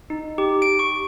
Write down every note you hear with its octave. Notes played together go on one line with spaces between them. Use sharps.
D#4
G4
D7
C#6